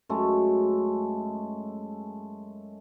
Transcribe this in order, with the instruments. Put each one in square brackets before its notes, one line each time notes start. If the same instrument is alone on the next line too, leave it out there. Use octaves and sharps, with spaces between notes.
[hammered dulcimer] F#2 G#3 A3